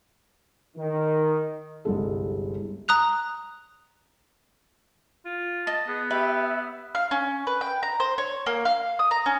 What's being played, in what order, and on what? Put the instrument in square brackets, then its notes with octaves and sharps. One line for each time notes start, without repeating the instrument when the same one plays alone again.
[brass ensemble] D#3
[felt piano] G1 C2 G#3 A4
[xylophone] A#5 D#6 F#6 F7
[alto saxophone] F4
[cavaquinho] D#5 [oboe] A5
[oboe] B3 [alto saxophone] G#4
[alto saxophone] G4 [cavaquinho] B4 [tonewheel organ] E5
[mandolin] F5
C#4
B4
G5
A#5
C5
C#5
A#3
F5
D#6
A#5
C#4